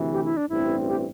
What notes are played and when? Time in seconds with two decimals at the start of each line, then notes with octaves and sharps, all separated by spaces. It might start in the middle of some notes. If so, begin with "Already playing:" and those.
Already playing: D2 C3 E3
0.12 G4
0.25 E4
0.37 D4
0.49 A1 G2 E3 C4 E4
0.87 G4